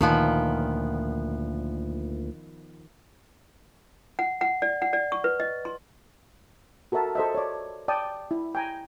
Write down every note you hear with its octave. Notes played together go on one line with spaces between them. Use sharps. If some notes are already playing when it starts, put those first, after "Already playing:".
D2 A#2 D#3 F3 B3
F#5
F#5
D5
F#5
D5
C#6
B4
D#5
C6
F#4 A4 A#4 E5 A5
A4 C5 D#5 E5
C#5 D5
D5 G5 A5 D#6
E4
G5 G#5 A#5